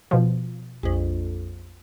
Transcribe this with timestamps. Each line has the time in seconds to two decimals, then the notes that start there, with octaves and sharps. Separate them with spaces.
0.11 B2 F3
0.83 A#1 F2